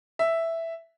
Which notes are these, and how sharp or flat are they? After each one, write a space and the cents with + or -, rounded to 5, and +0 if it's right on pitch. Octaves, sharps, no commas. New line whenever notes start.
E5 +0